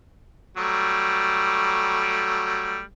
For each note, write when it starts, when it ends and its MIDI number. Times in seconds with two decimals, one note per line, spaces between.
0.57 2.81 54
0.57 2.81 55
0.57 2.81 57